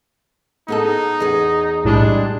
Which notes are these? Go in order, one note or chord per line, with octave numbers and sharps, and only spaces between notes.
B3 D#4 G#4 A4
E2 G#4
B1 A2 G3 G#3 D4